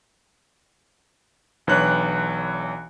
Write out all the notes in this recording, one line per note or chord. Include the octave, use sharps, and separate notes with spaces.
B1 E3 D4 C#5 F#6